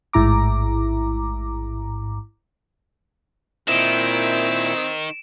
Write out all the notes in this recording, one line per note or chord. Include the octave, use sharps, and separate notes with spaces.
A1 G#2 E4 A#5 D6
A#2 D#3 C4 E4 E5 D7 E7